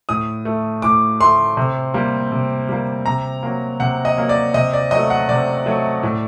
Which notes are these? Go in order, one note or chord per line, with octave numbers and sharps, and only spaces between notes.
A2 D#6
A3
A2 D6
A3 C6
C3
G3 A#3
C3
G3 A#3
C3 A#5
F#3 A#3
C3 F#5
D#5
F#3 A#3
D5
C3 D#5
D5
F#3 D#5
A3
F#5
C3 D5
F#3 A3
A2